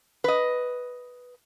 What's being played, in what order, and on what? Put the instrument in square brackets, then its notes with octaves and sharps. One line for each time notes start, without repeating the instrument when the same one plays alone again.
[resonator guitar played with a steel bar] B4 D#5